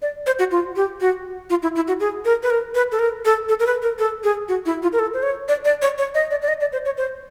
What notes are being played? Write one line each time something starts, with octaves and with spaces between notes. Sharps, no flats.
D5
C5
F#4
F4
G4
F#4
F4
E4
E4
F#4
G#4
A#4
B4
A#4
B4
A4
A#4
A4
A4
A#4
B4
A#4
A4
G#4
F#4
E4
F4
A#4
A4
C5
C#5
D5
D5
C#5
C#5
D#5
D5
D5
D#5
D5
C5
C#5
C5